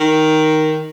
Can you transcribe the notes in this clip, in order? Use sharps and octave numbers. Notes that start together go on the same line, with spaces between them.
D#3